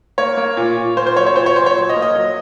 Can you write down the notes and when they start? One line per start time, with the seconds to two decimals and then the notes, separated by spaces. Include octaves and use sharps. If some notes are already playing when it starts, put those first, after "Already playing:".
0.18 A#3 C#5
0.37 A#3
0.57 A#2
0.77 A#2
0.97 A#3 C5
1.07 C5
1.16 F#3 C#5
1.26 C#5
1.36 A#2 C5
1.46 C#5
1.56 A#2 C5
1.66 C#5
1.76 F#3
1.89 D#5
1.96 A#3
2.02 D#5
2.16 F#3